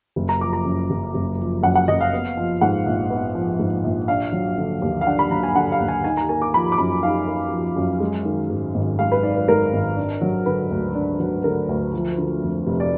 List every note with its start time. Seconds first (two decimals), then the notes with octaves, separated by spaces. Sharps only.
0.16 F#1
0.29 A#5
0.41 F3 D6
0.53 A#5
0.65 F#2
0.90 F#1
1.14 F#1
1.39 F3
1.63 F#2 F#5
1.75 F#5
1.88 F#1 D#5
2.01 F5
2.13 B3
2.37 F3
2.61 G#2 F#5
2.86 A#1
3.10 B3
3.35 F3
3.59 G#2
3.84 A#1
4.08 D4 F5
4.32 F#3
4.57 D3
4.82 D#2
5.01 F5
5.06 D4 F#5
5.19 B5
5.31 F#3 A#5
5.43 G#5
5.56 D3 F#5
5.72 F5
5.80 D#2
5.88 G#5
6.04 D#4 G#5
6.17 A#5
6.29 A#3 G#5
6.42 D6
6.54 F3 B5
6.72 D6
6.78 F#2 B5
7.03 D#4 F5
7.27 A#3
7.52 F3
7.76 F#2
8.00 G#3
8.25 D#3
8.50 G#2
8.74 G#1
8.99 G#3 F5
9.12 B4
9.23 D#3 D5
9.36 B4
9.48 G#2 A#4
9.73 G#1
9.97 D4
10.21 F#3
10.46 D3 B4
10.71 D2
10.95 D4
11.20 F#3
11.44 D3 A#4
11.69 D2
11.93 F3
12.18 D3
12.42 F2
12.67 F1
12.80 D5